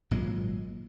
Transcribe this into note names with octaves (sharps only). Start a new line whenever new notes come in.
G#1 A#2 F#3 G#3